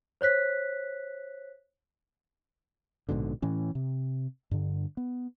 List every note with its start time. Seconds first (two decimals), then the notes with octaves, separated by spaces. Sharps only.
0.21 C5 C#5 F#6 B6
3.09 A#1 G#2 B2 D3
3.42 A2 E3 C#4
3.75 C3
4.51 G2 D3
4.97 B3